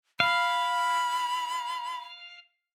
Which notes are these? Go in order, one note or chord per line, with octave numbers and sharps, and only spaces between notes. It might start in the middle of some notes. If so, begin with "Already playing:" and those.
F5 B5